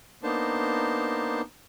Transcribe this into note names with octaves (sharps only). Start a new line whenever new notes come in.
A#3 B3 D4 D#4 C5 A5